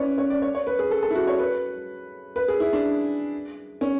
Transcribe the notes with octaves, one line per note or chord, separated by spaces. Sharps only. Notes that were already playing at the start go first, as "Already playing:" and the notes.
Already playing: C#4 E4 B4 C#5 D5
C#5
D5
C#5
C#5
B4
G#4
A4
A4
E4
F#4
C#5
B4
B4
G#4
E4
D4
C#4